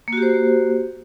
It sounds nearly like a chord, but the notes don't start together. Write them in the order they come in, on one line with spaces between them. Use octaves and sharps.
A#3 F#4 G4 C5